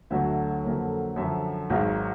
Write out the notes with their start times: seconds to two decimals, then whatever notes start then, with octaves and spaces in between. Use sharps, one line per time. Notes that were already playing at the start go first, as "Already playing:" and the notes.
0.10 D2 D3 F#3 E5
0.64 F2 D3 F#3 A#3
1.16 F#2 D3 F3 E5
1.70 G#1 G#2 D#3 F#3